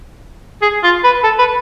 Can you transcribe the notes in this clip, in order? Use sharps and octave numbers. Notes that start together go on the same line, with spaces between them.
G#4
F4
B4
A4
B4